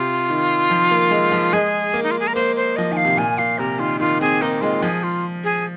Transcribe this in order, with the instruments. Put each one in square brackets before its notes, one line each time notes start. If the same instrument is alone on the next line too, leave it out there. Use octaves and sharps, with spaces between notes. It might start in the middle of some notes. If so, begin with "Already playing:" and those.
Already playing: [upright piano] C3 [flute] F4
[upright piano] D#3
F3
A#3
G#3
F3
[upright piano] G#3 [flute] G#4
[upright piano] A#3
[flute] D#4
F4
G#4
A#4
[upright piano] A#3 [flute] C5
[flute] C5
[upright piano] F3 [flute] D#5
[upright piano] D#3 [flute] G#5
[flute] F5
[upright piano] C3
[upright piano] A#2 [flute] G#5
[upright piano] A#2 [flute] F5
[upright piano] C3 [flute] A#4
[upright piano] D#3 [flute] F4
[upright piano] D#3 [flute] F4
[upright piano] C4 [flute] G#4
[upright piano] A#3 [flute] D#4
[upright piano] G#3 [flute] F4
[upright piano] F3 [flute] G#4
[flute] F4
G#4